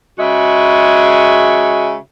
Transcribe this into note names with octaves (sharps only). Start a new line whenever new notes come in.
C#3 G#3 F#4 E5